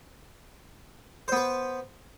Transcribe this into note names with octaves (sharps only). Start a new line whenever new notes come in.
B3 B4 C5